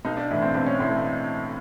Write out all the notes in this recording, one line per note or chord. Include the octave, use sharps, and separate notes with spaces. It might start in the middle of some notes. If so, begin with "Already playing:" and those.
B1 D#4
D4
A2 E3
C4
B1 C4
C#4
A2 E3 C4